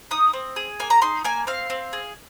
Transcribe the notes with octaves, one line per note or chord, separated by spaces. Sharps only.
D#4 D#6
C4
G#4
A#3 G#5
A#5
D#4 C6
A#3 G#5
C4 F5
C4
G#4